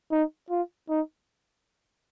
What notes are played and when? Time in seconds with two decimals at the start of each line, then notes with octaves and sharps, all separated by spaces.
0.12 D#4
0.50 F4
0.89 D#4